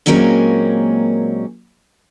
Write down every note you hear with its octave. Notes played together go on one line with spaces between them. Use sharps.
A#2 F#3 G#3 A#3 C4 C#4